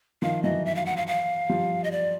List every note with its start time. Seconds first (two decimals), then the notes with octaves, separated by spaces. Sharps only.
0.22 D#3 F3 F5
0.43 E3 F#3 D#5
0.65 E5
0.75 F5
0.86 F#5
0.97 F5
1.07 F5
1.49 F3 G3
1.84 D#5
1.91 D5